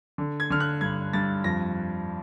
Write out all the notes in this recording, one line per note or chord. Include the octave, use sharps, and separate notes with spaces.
D3
G#6
D3 F6
F#6
G2 G#6
G2 A6
F2 A#6